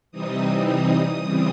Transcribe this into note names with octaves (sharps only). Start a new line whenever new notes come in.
C3 E3 G3 C4 D#4 D#6
D#6
C#3 E3 G3 C4